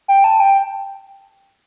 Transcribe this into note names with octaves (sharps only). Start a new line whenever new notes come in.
G5
A5
G5